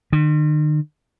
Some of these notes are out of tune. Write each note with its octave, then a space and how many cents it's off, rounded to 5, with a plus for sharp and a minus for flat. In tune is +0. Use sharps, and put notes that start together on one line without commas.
D#3 -45